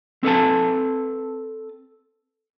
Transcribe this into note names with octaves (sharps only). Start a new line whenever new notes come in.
C4 A4 B4 A5